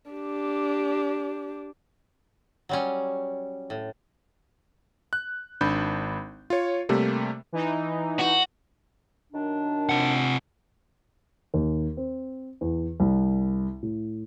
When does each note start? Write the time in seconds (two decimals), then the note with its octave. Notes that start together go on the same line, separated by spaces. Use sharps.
0.11 D4 G4
2.69 F#3 G3 C#4
3.70 A2
5.13 F#6
5.61 G#1 D4 B5 G6
6.50 F4 C#5
6.89 C3 G3 A3 A#3
7.52 E3 D#4
8.19 F#4
9.33 F#2 D#3 D4
9.89 C3 F#5
11.54 D#2
11.97 C4
12.61 E2
13.00 C2
13.83 A2